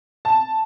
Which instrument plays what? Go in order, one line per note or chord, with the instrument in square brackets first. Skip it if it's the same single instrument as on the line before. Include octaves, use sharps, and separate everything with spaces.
[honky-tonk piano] A5